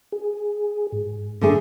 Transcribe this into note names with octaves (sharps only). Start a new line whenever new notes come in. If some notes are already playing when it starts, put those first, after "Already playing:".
G#4
G#2
D3 A3 G#4